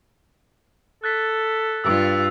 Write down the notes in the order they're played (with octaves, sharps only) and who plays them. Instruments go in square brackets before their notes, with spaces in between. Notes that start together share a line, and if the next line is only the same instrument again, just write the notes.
[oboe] A4 [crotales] F#6 A6 B6
[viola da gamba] G2 F4 [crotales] E6